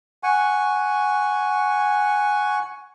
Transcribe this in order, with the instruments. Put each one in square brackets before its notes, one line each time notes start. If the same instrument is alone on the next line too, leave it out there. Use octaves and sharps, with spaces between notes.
[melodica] F#5 G#5 C#6